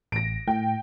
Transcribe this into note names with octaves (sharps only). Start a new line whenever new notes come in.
A1 A#6 D7
A2 G5